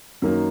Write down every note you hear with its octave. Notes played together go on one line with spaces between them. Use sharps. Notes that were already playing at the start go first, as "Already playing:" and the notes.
F#2 D#3 A#3